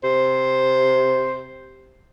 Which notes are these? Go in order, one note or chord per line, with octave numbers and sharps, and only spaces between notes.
C3 C5